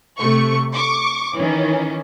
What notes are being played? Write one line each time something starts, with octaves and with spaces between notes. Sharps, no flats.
C3 A3 C#6
C#6 D6
D#3 E3 C#4